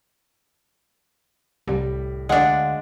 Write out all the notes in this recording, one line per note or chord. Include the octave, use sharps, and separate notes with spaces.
C2 A2 G3
D2 G#3 D4 F5 F#5